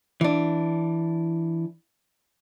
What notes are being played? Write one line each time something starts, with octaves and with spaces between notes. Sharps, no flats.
E3 D4